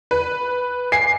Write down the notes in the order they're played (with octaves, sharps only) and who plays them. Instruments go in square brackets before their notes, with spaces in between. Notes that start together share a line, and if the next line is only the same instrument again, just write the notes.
[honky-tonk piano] B4
[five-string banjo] G#5 [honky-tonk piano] C7